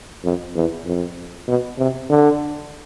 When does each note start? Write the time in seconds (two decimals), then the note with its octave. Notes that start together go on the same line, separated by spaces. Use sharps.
0.24 F2
0.55 E2
0.86 F2
1.48 B2
1.78 C3
2.10 D3